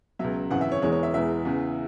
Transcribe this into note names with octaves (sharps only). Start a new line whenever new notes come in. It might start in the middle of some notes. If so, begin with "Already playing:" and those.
C#2 B2 F#3 E5
G#1 F#2 C#3 E3 F#5
E5
C#5
E1 E2 E3 G#3 C#5
C#5
E5
E1 E2 E3 G#3 E5
E2 C#3 E3